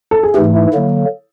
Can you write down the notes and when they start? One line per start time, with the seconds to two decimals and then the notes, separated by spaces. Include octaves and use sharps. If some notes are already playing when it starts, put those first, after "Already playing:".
0.11 A4
0.23 G#4
0.34 G#2 E3 A3 G4
0.54 E4
0.74 D3 F#3 A#3